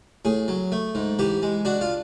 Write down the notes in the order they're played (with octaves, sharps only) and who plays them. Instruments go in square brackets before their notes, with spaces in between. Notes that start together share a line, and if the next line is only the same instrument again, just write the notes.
[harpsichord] A2 G#4
F#3
A3
G#2
E3 G4
G#3
D4 F#4
F4